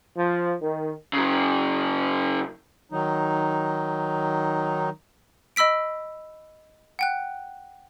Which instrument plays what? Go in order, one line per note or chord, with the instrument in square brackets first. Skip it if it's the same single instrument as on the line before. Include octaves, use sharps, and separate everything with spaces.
[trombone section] F3
D#3
[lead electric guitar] C#3 F#3
[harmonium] D#3 F#3 D#4
[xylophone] D#5 B5 E6 B6 D7
F#5 G5 F#6